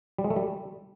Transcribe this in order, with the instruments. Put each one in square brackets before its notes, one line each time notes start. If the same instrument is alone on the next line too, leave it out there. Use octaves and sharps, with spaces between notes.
[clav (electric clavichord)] G3
G#3
A3
G3